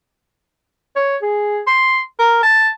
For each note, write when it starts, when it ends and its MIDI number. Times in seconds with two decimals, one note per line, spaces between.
0.96 1.16 73
1.22 1.60 68
1.67 2.00 84
2.19 2.40 70
2.43 2.69 81